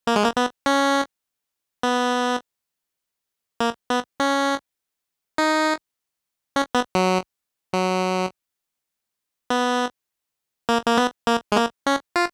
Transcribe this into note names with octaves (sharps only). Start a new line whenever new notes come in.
A#3
G#3
A#3
B3
C#4
B3
A#3
B3
C#4
D#4
C#4
B3
F#3
F#3
B3
A#3
A#3
B3
A#3
G#3
A#3
C#4
F4